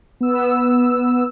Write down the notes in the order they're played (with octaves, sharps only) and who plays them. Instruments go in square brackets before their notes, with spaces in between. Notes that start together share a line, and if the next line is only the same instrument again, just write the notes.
[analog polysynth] B3 E6